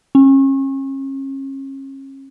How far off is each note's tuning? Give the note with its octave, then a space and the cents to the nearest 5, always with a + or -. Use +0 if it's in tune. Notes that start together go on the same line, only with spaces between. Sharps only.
C#4 -35